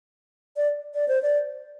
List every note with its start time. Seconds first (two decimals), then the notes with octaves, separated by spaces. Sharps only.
0.57 D5
0.94 D5
1.08 C5
1.22 D5